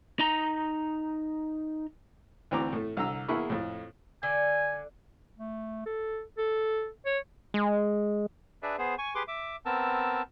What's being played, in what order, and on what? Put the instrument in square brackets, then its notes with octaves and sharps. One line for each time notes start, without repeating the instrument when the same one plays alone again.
[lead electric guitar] D#4 A#5
[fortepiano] D2 E3 C4 A#5 D6
A2 A3
C2 D3 A#5 E6
E2 A#3 E4 G#4 B5 C#6
F2 A2
[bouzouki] D3 [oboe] G#5
[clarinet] A3
A4
A4
C#5
[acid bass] G#3
[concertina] D4 G#4 B4 D5 E5
B3 G#4 C5
G#5 C#6
G4 G#4 B4 C6 D6
E5 D6
B3 C4 A#4 A5 E6